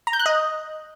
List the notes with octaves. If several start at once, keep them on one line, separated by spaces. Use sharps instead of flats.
A#5
G6
F#6
D#5